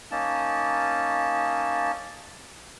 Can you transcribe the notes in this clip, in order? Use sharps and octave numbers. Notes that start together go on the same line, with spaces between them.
A#3 C#4 D#4 A5